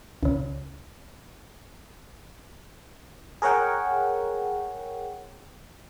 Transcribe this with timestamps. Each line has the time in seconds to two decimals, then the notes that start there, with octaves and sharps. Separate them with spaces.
0.23 C#2 C#3
3.42 G#4 A#4 C#5 F#5 G5